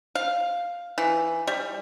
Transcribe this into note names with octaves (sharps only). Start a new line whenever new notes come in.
F5
E3
G3